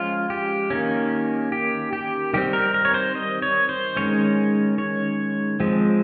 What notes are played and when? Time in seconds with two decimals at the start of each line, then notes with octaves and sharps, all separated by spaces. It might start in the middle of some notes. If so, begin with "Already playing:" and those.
Already playing: F3 G#3 C#4 F4
0.30 G4
0.70 D#3 A#3 C#4
1.52 G4
1.93 G4
2.34 D#3 G3 C4 G4
2.53 A#4
2.74 A#4
2.85 C#5
2.94 C5
3.15 D#5
3.42 C#5
3.69 C5
3.97 D#3 G#3 C#4 C#5
4.78 C#5
5.60 F3 G#3 C4